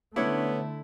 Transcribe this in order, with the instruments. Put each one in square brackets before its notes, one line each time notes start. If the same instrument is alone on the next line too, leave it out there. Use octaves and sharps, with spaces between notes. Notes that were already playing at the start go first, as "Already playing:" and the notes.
[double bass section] D3 A3 [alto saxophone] B3 [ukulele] C#4 D4 C#5 [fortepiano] E4